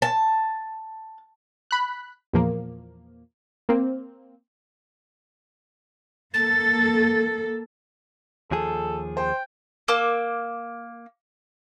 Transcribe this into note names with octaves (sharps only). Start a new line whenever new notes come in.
A5
B5 F#6
E2 A#2 F3 A#3
A#3 C4
A#3 A4 A6
D#2 F3 G#4 A4
C5 G5
A#3 D6 E6